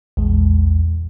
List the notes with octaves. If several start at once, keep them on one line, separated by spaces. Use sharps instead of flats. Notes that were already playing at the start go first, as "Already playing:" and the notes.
A#1 E2 G#3